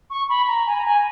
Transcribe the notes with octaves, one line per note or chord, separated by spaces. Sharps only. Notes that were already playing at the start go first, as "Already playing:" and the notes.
C#6
B5
A#5
G#5
A#5
G#5